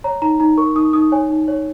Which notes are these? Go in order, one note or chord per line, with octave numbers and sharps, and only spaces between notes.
C#5 A#5
D#4 A#5
D#4 A#5
A#4 C#6
D#4 D#6
D#4 D#6
C#5 G#5
D#4
C#5